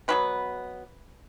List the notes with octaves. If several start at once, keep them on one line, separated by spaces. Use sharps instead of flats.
B2 F#3 B3 B4